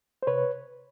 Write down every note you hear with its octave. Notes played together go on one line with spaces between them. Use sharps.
C5
C3 B4 C#5